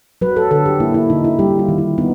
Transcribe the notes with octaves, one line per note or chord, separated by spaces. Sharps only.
F#3 B4
A4
D3 A4
G4
A#3 E4
E4
D3 D#4
E4
G3 G4
F4
D#3
E4
B3 D#4